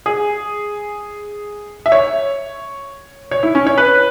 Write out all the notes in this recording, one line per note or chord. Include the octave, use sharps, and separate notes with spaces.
G#4
E5
C#5
C#5
E4
C#4
C#5
B4